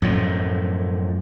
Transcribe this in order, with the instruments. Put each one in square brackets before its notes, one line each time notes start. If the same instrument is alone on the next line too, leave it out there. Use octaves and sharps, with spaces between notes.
[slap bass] F#2 A2 F3